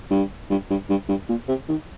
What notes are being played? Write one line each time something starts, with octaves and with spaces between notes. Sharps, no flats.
G2
G2
G2
G2
G2
A#2
C3
D#3